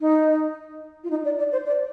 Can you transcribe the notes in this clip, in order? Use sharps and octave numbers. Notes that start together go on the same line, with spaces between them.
D#4
F4
D#4
D5
D5
C5
D5